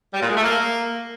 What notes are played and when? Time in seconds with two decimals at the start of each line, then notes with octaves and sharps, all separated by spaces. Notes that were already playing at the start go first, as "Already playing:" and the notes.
0.13 G3
0.21 A#2
0.28 G#3
0.36 A3
0.43 A#3